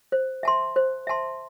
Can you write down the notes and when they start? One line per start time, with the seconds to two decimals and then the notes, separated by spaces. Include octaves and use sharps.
0.12 C5
0.43 E5 A5 C6
0.76 C5
1.07 E5 A5 C6